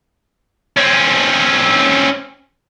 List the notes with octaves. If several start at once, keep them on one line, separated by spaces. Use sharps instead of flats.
C4 C#4